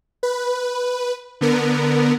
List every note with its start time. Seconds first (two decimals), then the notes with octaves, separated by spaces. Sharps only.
0.23 B4
1.41 D3 B3 A#4